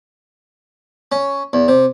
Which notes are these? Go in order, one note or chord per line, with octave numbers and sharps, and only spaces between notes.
C#4
E2
C3